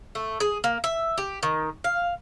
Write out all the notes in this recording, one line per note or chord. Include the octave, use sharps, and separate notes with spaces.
A3
G#4
A#3
E5
G4
D#3
F5